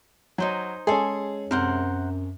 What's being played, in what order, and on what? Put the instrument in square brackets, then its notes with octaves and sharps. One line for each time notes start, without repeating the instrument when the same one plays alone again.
[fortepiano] F#3 [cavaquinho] D#4 C5 G#5
[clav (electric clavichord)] G#3 C#4 [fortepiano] G#4 A4 [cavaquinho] G#5 C6
[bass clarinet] F#2 [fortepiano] C3 [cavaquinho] A#4 C5 F#5